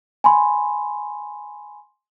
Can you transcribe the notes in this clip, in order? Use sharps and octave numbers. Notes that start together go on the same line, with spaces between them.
G#5 B5 C6